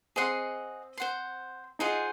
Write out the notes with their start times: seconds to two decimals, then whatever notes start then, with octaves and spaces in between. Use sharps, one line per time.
0.16 C4 G#4 D#5 F#5 C6
0.97 C5 F#5 C6
1.79 D#4 F4 G#4 C5 F#5